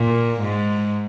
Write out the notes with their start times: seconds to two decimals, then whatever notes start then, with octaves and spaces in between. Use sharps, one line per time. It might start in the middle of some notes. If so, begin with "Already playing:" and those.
Already playing: A#2
0.41 G#2